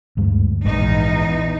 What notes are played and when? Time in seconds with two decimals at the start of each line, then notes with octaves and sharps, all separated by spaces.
0.17 D2 G2 G#3
0.64 A#1 E2 G#2 D#4